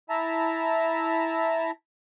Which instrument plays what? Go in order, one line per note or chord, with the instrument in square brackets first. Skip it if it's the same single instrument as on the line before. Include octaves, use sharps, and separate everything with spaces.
[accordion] E4 E5 A5 A#5